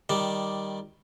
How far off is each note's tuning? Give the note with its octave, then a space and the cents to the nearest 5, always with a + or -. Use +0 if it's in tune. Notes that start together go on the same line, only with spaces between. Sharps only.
D#3 +0 G3 +0 D5 +0